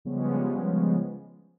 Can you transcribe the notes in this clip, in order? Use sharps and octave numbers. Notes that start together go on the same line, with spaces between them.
C#3 F3 G3 G#3 B3 C#4